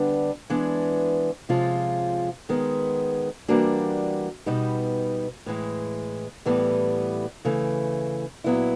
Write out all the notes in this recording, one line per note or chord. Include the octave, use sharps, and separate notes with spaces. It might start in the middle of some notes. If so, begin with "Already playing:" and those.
Already playing: D3 G3 B3 D4
E3 G#3 B3 D4
C3 F3 G#3 C#4 F4
D#3 G#3 B3
E3 G3 A#3 D4 F#4
B2 G3 B3 D#4
A2 E3 G#3
A2 E3 G3 B3
C#3 E3 A3
A#2 F#3 B3 E4